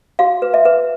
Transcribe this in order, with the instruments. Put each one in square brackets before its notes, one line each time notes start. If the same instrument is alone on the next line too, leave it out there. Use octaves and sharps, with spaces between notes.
[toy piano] F#4 F5
B4
E5
B4